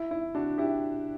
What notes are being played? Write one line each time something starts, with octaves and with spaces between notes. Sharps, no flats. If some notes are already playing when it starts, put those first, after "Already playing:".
Already playing: E4
E4
D4 F#4
E4 G4